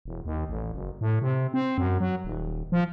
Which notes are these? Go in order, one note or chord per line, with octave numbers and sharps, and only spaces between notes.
E1
D#2
A1
F#1
A2
C3
C4
F#2
F#3
D#1
F3